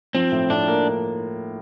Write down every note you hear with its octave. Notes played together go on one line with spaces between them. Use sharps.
F3 C4
A2
A2 D4
A#3